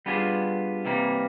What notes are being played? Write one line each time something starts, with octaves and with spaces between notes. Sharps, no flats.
G3 B3 D4 F4 G#4
C3 E3 G3 A#3